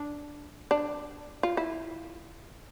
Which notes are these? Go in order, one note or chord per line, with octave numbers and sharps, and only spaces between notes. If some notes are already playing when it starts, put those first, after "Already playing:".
Already playing: D4
D4
F4
E4